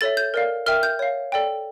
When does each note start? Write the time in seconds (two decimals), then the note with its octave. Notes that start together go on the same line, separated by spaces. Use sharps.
0.01 A4 C#5 E5 A6
0.17 G6
0.34 A#4 D5 F5
0.66 A#4 E5 G5 F6
0.83 G6
0.99 C#5 F5
1.32 A4 D5 G5